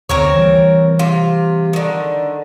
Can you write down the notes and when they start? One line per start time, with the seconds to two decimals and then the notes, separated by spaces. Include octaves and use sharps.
0.09 D2 C4 A#4 C#5
0.34 E3 G3
0.99 C3 F4
1.73 D3 D#3